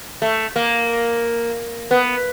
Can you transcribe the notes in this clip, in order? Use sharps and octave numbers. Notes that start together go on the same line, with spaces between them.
A3
A#3
B3